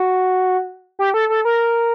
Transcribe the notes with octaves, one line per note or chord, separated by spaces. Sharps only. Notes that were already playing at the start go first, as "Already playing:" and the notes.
Already playing: F#4
G4
A4
A4
A#4